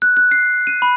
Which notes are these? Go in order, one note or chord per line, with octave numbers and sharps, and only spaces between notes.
F#6
F#6
C7
D#7
B5